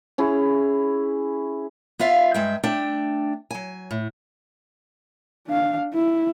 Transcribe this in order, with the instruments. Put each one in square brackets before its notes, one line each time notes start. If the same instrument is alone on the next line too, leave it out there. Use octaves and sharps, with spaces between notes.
[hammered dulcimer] C#4 E4 G#4
[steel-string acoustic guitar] B3 F4 E5 F5
G2 G#3 E5 G5
A3 D4 G5
F#3 G#5
A2
[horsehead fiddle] D4 F5
E4